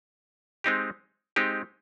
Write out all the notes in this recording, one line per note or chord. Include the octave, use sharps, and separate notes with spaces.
G#3 C4 D#4 G4
G#3 C4 D#4 G4